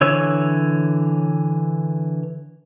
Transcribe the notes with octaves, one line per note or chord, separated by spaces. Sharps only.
D3 E3 C#5 E6